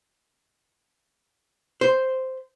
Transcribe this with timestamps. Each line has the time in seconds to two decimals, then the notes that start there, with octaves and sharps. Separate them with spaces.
1.81 C5